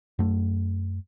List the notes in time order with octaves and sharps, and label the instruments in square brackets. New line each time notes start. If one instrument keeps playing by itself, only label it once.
[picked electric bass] F#2 A3